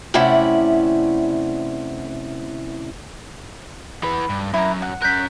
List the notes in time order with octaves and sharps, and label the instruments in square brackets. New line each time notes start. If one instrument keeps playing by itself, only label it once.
[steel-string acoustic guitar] C3 A3 C#4 E4 D5 F#5
[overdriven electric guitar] E3 B3 [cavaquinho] B5
[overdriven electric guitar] G2
[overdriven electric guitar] F#2 [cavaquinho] E4 A#5
[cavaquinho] F#5
[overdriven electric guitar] C#4 A#4 [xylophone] F#6 G6 B6